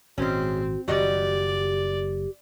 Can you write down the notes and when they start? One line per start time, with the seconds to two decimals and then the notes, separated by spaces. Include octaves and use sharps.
0.18 G#1 A#2 G#3 C4 C#4 F#4
0.88 F#1 F#2 D#3 G3 F#4 G4 D5 D#5